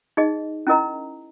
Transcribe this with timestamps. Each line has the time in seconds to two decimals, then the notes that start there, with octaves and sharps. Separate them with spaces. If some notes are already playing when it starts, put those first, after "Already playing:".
0.17 D#4 G#4 D#5
0.67 C#4 E4 A#4 D#5 A#5